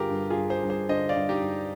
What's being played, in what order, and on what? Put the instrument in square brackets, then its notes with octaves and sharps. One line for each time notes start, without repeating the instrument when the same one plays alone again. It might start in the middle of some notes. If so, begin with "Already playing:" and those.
Already playing: [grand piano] G2 D3 F4 G4 G#4 A#4
G2
F4 G#4
G2
G#4 C5
G2
G#4 C5
D3 C5 D#5
D5 F5
G2
D#4 G4
G2